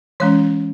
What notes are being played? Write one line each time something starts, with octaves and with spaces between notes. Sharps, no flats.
E3 G#3 C#4 C#5